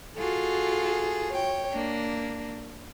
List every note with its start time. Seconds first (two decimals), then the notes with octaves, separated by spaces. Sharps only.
0.17 F4 F#4 G#4 A4
1.33 C#5 G5
1.72 A#3 D4